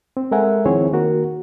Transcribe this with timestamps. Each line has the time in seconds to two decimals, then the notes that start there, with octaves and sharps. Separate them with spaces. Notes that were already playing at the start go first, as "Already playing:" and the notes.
0.17 C4
0.31 G#3 A4 A#4 E5 F#5 G#5
0.66 D#3 F3 C4 E4 G#4 C#5
0.93 D#3 A#3 F#4 A#4